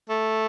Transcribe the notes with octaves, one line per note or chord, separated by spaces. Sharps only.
A3